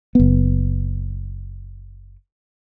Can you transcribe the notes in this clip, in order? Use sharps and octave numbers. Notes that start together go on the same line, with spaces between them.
F#1 B3